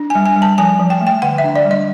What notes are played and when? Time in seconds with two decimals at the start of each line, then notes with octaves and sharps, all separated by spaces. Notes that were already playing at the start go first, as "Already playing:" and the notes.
Already playing: D4
0.10 G#5
0.15 G3
0.26 G#5
0.36 G3
0.42 A5
0.58 F3 G#5
0.79 F3
0.90 G5
1.01 A3
1.07 G5
1.22 D3 F#5
1.38 E5
1.44 D4
1.56 D5
1.65 G3
1.71 D#5